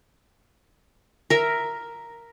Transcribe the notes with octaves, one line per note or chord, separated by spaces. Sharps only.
A#4 E5